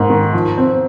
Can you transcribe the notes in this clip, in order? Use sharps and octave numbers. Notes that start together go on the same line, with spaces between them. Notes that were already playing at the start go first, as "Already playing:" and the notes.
Already playing: G#2 A#3
D#3
F3
C4